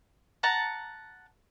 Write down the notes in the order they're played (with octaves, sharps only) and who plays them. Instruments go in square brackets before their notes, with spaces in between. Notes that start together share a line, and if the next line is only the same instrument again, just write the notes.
[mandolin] F#5 A5 A#5